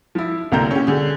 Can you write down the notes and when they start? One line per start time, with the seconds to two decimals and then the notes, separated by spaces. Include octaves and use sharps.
0.15 F3 E4
0.52 C2 D3 A#3 C4 A#5 G6
0.71 C#4 G4
0.87 D3 G#4